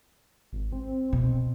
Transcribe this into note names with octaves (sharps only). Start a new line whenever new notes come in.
G#1
C4
B2